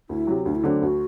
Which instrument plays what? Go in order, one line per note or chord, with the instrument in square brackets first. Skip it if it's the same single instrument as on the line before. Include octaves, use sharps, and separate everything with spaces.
[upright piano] D2 [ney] E4
[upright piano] C3 F#3
[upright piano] D2 [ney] D4
[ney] E4
[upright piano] D3 F#3 A3 C4 [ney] D4
[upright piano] D2 [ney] F#4